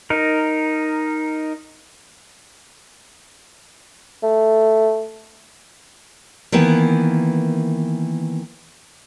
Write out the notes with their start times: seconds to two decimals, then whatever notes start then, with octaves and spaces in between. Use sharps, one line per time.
0.10 D#4 A#4
4.23 A3
6.52 D#3 E3 A#3 B3